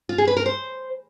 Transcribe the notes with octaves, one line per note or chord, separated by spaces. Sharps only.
F4
G#4
B4
A#4
C5